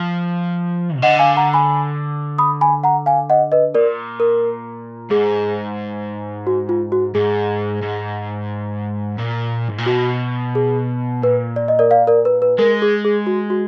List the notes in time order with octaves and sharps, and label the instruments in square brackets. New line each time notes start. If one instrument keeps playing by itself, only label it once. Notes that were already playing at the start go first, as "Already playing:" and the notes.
Already playing: [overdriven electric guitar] F3
B2
[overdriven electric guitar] D3 [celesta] D#5 F#5
[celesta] F5 G#5
F#5 A#5
G#5 B5
B5 D#6
G#5 B5
F#5 A#5
F5 G#5
D#5 F#5
B4 D#5
[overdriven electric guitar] A#2 [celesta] A#4 D5
[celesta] A#4
[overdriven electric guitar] G#2 [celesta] G#4
[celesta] F#4
F4
F#4
[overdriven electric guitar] G#2 [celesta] G#4
[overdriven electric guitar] G#2
A#2
G#2
A#2
[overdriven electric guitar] B2 [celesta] F#4
[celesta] G#4
[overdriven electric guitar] A#2 [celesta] B4
[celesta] D5
D#5
A#4 D5
D5 F5
A#4 D5
B4
B4
[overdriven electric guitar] G#3 [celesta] A#4
[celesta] G#4
G#4
F#4
F#4